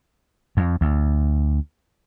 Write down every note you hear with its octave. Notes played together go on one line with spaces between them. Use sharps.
F2
D2